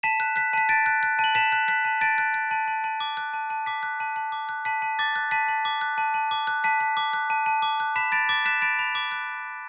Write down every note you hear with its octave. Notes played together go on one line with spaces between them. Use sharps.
A5 B6 E7
F#6
F#6 B6
A5 B6
A5 A6 D7
F#6
F#6
A5
F#7
A5 B6 E7
F#6
F#6 B6
A5
A5 A6 D7
F#6
F#6
A5
A5
A5
D6
F#6
A5
A5
D6 B6
F#6
A5
A5
D6
F#6
A5 B6
A5
D6 A6
F#6
A5 B6
A5
D6
F#6
A5
A5
D6
F#6
A5 B6
A5
D6
F#6
A5
A5
D6
F#6
B5 B6 E7
B5 A6 D7
D6 A6
F#6 B6 E7
B5 A6 D7
B5
D6
F#6